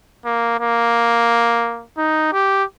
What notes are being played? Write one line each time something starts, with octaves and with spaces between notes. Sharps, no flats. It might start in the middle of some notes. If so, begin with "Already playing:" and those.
A#3
A#3
D#4
G4